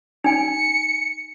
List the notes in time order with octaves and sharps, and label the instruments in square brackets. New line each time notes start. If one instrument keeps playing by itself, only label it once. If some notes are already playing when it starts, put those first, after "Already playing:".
[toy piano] D#4 G#5 [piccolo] C#7